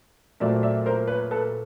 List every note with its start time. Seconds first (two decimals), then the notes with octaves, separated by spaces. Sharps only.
0.40 A#2 F#3 A3 C4 D5 E5
0.63 D5 E5
0.86 A#4 C5
1.07 B4 C#5
1.31 A4 B4